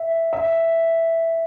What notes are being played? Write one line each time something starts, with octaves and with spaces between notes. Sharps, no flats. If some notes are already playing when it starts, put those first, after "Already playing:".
Already playing: E5
E5